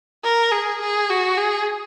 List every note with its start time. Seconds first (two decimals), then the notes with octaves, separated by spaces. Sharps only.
0.24 A#4
0.51 G#4
0.81 G#4
1.10 F#4
1.37 G#4